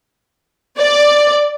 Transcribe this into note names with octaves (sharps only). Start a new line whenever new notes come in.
D5